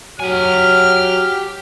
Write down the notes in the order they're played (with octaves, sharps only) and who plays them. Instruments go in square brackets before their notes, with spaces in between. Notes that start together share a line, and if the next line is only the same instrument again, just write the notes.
[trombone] F#3 [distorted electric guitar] G4 G#5 [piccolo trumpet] F6